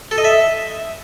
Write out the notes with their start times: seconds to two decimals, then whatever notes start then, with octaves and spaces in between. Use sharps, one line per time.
0.11 A4
0.18 D#5
0.24 E5